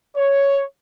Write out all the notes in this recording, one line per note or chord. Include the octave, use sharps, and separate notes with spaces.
C#5